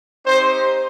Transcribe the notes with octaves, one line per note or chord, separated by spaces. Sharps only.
C4 D#4 G4 C5